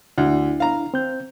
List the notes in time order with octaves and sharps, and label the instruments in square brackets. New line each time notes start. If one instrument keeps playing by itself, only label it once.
[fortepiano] D2 [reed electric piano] D4 E4
[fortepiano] F5 A#5
[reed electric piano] C4 G6